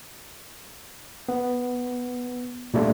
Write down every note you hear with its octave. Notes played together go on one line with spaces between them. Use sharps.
B3
A#2 G3 A3 D4 F4